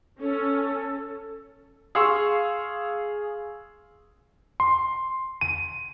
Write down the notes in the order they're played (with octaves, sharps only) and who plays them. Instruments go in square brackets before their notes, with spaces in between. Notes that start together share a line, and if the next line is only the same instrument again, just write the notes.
[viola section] C#4 [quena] A4
[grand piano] G#4 F5 C6 C#6 E6
[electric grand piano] C6
D#7